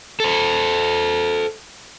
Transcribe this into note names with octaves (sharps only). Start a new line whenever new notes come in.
A4 C5